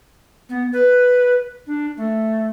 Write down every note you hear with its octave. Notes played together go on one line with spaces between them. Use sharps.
B3
B4
D4
A3